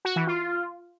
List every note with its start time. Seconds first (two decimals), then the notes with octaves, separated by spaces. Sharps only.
0.05 F#4
0.16 E3
0.27 F4